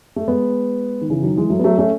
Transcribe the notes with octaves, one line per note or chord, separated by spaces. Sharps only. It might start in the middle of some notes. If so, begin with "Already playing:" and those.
A3
G#3 B3
D#3
C#3 E3
D#3 F#3
E3 G#3
F#3 A3
B3
F#3 A3
A3 C#4